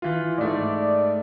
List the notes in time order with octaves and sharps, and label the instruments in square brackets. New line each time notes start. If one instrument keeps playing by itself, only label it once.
[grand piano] E3 F4
[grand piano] G#2 A3 [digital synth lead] D5